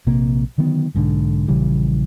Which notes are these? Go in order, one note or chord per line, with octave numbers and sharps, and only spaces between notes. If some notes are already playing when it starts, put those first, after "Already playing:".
A#1 C3 A#3
D3 D#3 F#3 B3
B1 G#2 D3
A#1 C#3 E3 G3